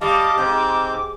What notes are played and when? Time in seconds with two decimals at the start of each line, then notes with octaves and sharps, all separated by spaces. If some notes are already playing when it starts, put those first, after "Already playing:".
0.01 G3 D#5 F5 A5 D6
0.38 G#2 C4 G6